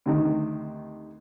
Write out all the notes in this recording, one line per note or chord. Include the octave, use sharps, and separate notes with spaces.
D2 C3 D#3